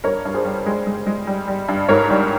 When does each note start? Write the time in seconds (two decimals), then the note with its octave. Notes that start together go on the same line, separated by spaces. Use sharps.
0.04 G2 A#4 C#5
0.25 G2
0.34 G#4 C5
0.45 G3
0.66 G#3
0.87 G#3
1.07 G#3
1.27 G3
1.48 G3
1.68 G2
1.89 G#2 A#4 C#5
2.10 G3